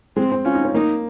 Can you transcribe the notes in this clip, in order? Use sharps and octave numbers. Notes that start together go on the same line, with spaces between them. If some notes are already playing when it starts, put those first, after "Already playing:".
G#3 C4
C4
C#4 F4
D#4
C#4
A#3 D#4